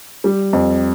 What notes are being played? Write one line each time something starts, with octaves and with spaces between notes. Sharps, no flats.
G3
F2